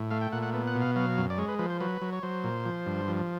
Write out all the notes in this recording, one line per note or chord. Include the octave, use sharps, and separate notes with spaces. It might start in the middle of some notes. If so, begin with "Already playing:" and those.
Already playing: A2
A3 F5
G5
A#2 F#5
F#5
B3
F#5
B2
F5
F#3 F5
F#2
D5
G#3 C#5
B4
F3 B4
C5
F#3 B4
F#3
C#5
F#3 C5
A#2
F3
G2
F3